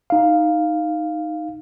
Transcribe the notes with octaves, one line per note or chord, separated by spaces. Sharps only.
D#4 F5